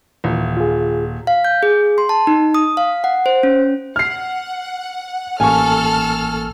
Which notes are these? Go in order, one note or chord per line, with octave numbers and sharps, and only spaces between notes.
D#1 E3
F4 G#4
F5
G6
G#4
C6
A5
D#4
D#6
F5
F#5
C5
C#4
F#5 F6 C7
A1 A#3 A4 G#5 C#6 F6